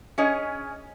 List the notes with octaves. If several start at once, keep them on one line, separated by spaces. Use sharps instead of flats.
C#4 G#4 C#5 D#5